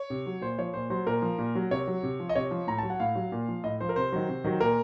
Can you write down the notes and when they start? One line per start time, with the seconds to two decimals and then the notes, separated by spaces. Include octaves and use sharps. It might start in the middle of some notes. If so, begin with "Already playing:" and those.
Already playing: C#5
0.10 C3
0.26 F#3
0.41 A#2 C5
0.58 F3 C#5
0.74 A#2 C5
0.90 F#3 C5
1.07 A#2 A#4
1.22 F3
1.38 A#2
1.55 F#3
1.71 C3 C#5
1.87 F#3
2.03 C3
2.20 F3
2.29 D#5
2.35 C3 C#5
2.51 F3
2.67 A2 A#5
2.78 F#3 A5
2.90 F#5
3.00 A2 F5
3.15 F#3
3.32 A#2
3.48 F3
3.64 A2 D#5
3.80 F3 C5
3.89 A#4
3.96 C3 C5
4.12 D#3 F#3
4.28 C3
4.44 D#3 F#3
4.60 A#2 A#4